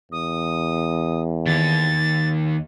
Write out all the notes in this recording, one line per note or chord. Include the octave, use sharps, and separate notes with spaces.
E2 D#6
D#2 A6